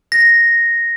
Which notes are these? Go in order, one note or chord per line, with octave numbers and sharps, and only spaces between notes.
A#6